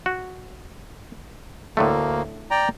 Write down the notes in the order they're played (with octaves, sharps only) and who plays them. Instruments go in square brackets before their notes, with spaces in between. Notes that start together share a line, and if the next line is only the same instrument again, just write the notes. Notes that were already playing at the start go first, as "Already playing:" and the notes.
[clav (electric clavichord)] F#4
[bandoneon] D2 A#3 [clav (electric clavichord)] A2 D3 A3
[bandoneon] D5 G5 A#5